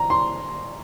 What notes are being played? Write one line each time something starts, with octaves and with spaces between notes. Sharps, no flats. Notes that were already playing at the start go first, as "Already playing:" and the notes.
Already playing: A#5
C6